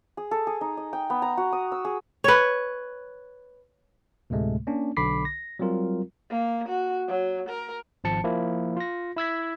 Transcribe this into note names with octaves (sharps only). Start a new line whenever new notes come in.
G#4
A4
G#4
D#4
D#5
G5
B3
A#5
F#4
D#6
E6
G#4
B4 C#5
D2 A2 C3 G#3 A3
A#3 C#4 D4
B1 D3 B5 D6 B6 C7
A#6
F#3 G3 C4 F4 A#4
A#3
F#4
F#3
A#4
G#1 F3 A5 C#7
F3 A#3 E4
F4 A#6
E4 E6 G#6 B6